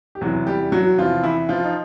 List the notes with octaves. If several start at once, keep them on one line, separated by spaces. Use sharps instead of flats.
G4
E2 C3 E3 F#3 F#4
G3 G4
F#3 F#4
E2 C3 E3 F3 F4
E3 E4
F3 F4
D#4